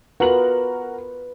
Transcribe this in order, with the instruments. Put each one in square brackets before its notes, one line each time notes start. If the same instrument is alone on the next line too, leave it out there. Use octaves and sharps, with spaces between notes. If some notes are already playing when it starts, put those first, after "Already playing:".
[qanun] B3 F4 [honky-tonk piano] F#4 A#4 F#7 [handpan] B4